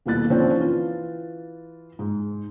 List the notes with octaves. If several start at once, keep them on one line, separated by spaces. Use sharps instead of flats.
D#1 B2 A#3 E4 F#6 A6
D3 F3 A#3 C4 C#4
E3 F4
G#2